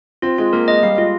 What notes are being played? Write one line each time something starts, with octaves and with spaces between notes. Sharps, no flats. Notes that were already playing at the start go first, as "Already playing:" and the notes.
C4 F4
G#3 F4
A#3 A#4
G#3 D#5
G3 F5
G#3 F4